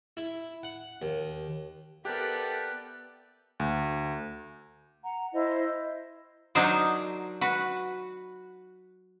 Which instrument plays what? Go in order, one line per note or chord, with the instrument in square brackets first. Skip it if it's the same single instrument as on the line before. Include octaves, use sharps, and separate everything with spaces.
[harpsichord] E4
F#5
D#2
[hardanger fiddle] B3 D5 [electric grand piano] G4 A#4 [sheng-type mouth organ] A4 E5 G5 [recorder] F#6
[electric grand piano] D2
[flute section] F#5 A#5
E4 C5 D#5
[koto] F#3 D4 D#4 A#4 C5 D5
F#4 B4